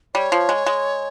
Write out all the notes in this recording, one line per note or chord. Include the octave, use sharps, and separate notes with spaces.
G3 C#5
F3
G#3
G#3